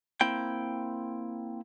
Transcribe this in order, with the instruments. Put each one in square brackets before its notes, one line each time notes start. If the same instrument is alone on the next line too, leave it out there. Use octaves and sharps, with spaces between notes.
[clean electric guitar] A#3 C4 E4 G5